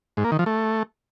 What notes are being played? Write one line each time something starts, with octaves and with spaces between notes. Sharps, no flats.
G#2
A#3
D#3
F3
A3